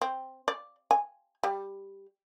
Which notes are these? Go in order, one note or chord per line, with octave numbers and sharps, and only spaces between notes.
C4
D5
G#5
G3